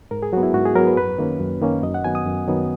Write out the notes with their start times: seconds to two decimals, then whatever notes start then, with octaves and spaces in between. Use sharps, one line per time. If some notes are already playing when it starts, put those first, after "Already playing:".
0.11 G#2 A#4
0.23 G#4
0.33 F#3 B3 F#4
0.43 E4
0.54 G#2 F#4
0.66 G#4
0.75 F#3 B3 A#4
0.87 B4
0.97 F#2 B4
1.18 D#3 A#3 C#4
1.40 F#2
1.62 D#3 A#3 C#4
1.83 F#2 D#5
1.94 F#5
2.04 D#3 F#3 B3 G#5
2.15 D#6
2.26 F#2
2.48 D#3 F#3 B3